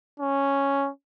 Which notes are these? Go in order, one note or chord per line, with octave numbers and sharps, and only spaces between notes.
C#4